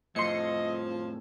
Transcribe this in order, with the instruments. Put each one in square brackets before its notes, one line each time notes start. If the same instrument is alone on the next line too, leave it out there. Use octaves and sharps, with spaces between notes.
[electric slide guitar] F2 A2 [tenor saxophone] F3 [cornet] D#5 [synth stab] C6 C#7